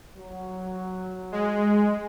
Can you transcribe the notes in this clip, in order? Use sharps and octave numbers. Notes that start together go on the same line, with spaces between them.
F#3
G#3